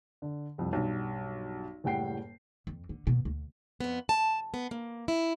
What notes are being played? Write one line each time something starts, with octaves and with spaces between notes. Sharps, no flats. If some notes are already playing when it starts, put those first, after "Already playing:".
D3
C2 F2
B1 G2
F#1 A2 G3 F#5 G5 C7
F2
D3
B2
D2
F2 B3
A5
B3
A#3
E4